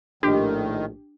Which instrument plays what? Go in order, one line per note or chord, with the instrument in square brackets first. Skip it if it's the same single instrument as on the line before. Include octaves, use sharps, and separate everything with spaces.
[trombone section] A#1 A2 [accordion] D#3 [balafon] D4 [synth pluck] G4